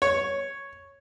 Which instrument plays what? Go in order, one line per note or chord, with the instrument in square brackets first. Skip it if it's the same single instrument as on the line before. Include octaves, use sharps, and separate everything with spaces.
[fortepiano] C#5